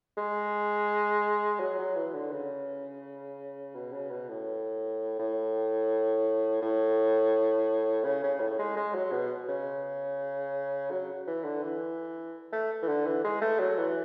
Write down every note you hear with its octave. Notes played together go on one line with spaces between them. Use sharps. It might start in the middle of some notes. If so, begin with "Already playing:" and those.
G#3
F#3
F#3
E3
D3
C#3
B2
C#3
B2
A2
A2
A2
C#3
C#3
A2
G#3
G#3
F#3
B2
C#3
F#3
E3
D3
E3
A3
E3
D3
E3
G#3
A3
F#3
E3